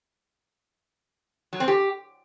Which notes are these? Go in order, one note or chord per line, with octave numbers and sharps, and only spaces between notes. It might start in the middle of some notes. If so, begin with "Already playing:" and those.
F#3
C4
G4